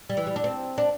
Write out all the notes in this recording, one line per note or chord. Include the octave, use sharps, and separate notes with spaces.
G3
E3
G3
D4
C4
D4